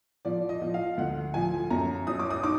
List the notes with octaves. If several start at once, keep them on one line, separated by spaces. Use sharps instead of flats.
F3 D5
D#5
F3
F5
D2 F#5
F3 G#5
F#2 A#5
F#3 D#6
D6
D#6
D#4 D6